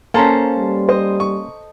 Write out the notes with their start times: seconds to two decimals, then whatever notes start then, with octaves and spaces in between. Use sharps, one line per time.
0.14 A#3 C#4 A4 C5 A5 A#5
0.58 G3
0.89 C5 D#5
1.20 C#6